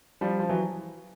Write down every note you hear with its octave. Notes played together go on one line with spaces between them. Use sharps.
F3 G3
F3
E3 F#3